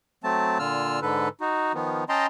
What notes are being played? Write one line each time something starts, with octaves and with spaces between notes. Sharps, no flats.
F#3 A3 C4 A5
A#2 D3 F4 E6 F6
G#2 D3 A4 B4
D#4 F#4
D#3 F3 B3
C#4 D#5 G5 A5 A#5 C6